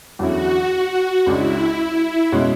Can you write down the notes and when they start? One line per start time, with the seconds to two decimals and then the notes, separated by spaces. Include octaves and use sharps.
0.19 E2 D3 F#3 C#4 E4 F#4
1.26 C#2 C#3 G#3 D4 E4
2.32 B2 G#3 C#4